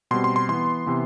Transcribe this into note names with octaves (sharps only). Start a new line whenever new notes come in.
B2 G3 C4 C6
C6
C6
E3 B3 C6
C3 E3 B3